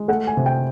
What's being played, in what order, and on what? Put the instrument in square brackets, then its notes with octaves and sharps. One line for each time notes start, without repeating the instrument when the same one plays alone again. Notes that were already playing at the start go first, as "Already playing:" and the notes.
Already playing: [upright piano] G#3
A3 F#5
G#5
C3
G5